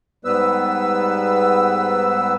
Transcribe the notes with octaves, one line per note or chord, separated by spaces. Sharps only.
G#2 G3 B3 B4 E6